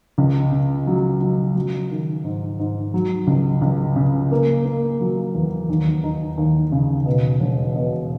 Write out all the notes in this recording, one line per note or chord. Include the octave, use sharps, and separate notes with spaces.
C#2
C#3
F#3
F#3
F#3
D#3
G#2
G#2
F#3
C#2
C#2
C#3
A#3
A#3
F#3
E2
D#2
D#4
D#2
C#3
B2
E1
B2